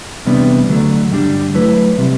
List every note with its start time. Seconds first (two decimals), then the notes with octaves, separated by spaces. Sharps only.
0.25 E2 C3 G3 B3 D4
0.69 D2 D3 F#3 A3
1.12 G2 D3 G3 D4 G4
1.54 F#3 A3 E4 B4
1.98 C3 G3